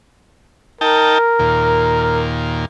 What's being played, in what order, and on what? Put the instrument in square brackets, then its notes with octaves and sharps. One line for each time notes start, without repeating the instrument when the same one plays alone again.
[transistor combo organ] D#4 G5 A5 [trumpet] A#4
[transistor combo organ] D#2 A#2